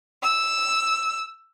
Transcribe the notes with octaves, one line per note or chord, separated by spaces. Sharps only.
E6